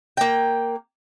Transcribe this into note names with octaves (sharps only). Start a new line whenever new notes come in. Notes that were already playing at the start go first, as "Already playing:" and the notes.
A#3 G5